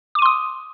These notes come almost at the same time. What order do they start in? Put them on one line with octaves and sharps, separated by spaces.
D6 D#7 C6 D#6